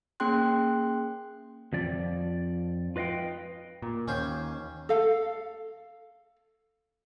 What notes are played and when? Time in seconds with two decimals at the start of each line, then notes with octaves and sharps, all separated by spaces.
0.20 A#3 C#4 G#4 G5 C6 F#6
1.73 F2 F3 D5
2.96 F4 B4 D#5 F5 G5
3.82 A#2
4.08 D#2 C#4 C5
4.89 A4 F5